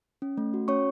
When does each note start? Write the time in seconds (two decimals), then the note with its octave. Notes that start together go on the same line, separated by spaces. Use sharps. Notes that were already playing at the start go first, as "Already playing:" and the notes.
0.22 C#4
0.37 A3
0.54 F#4
0.68 C#4 C#5 C#6